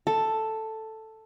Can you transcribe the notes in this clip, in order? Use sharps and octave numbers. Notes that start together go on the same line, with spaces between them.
A4